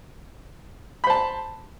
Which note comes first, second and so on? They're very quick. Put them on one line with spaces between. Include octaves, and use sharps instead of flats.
B5 C5 A5